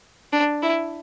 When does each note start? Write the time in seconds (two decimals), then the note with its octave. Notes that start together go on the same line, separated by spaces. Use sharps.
0.33 D4
0.62 E4